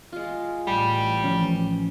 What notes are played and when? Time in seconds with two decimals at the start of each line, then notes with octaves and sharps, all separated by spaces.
0.12 G#3 F4
0.67 A1 G3
1.24 E3 F3 C#4